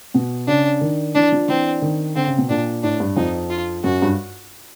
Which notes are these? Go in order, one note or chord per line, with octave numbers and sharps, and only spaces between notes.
B2
C#3 D4
D#3
E3 D4
F3
E3 C4
D#3
D3 C4
C#3
B2
A#2 D4
A2 D4
G2
F2 D#4
F4
F#2 F#4
G2